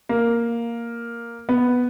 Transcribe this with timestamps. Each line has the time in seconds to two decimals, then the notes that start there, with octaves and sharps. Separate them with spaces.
0.09 A#3
1.49 B3